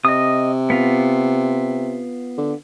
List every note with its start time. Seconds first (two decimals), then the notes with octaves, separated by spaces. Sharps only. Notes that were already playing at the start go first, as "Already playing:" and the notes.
0.05 C3 D#5 D#6
0.70 B3 F4
2.38 D3